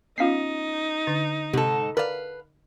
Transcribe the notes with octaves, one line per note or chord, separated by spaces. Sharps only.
B3 C#4 D#4 F4 F5 B6 C7
D3 D4 A6 A#6
G#2 C3 A4
A#4 B4 D5 F5